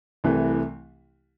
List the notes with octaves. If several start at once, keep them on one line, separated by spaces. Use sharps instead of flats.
C2 C3 E3 A3